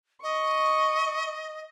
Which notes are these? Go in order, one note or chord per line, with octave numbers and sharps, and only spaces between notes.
D#5 C#6